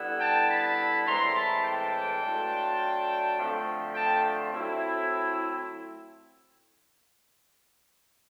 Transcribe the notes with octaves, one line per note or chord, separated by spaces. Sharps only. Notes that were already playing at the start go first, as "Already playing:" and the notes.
Already playing: D3 G3 B3 E4
G5 A5
A5 B5
A2 E3 G#3 C4 A#5 C6
A5 B5
G5 A5
F#3 A3 D4 F4
D3 F3 A3 C4
G5 A5
F#3 A3 C4 E4